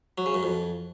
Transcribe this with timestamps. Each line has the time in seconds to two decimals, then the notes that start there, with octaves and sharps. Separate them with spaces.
0.18 F#3
0.26 C#3
0.34 F#2
0.43 F2